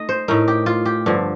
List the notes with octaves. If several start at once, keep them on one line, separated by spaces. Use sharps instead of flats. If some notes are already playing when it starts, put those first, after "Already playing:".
Already playing: A3 D#4 D#5
C5
A2 A3 D#4 A#4
G4
F4
G4
G2 D3 F3